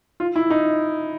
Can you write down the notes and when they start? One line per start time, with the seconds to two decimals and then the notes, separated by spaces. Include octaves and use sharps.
0.20 F4
0.36 E4
0.50 D#4